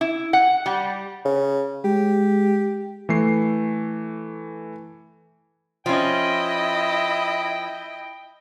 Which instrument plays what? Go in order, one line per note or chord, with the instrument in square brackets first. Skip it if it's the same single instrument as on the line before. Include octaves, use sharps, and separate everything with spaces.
[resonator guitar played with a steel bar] E4
F#5
G3
[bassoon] C#3
[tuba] G#3 [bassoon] G4
[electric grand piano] E3 A3 C7
[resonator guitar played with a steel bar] F3 C#4 [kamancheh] E4 D#5 [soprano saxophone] G5